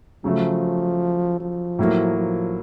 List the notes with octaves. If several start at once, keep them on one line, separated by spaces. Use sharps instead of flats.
C#3 F3 F#3 A3
F3
A2 F#3 A#3
F3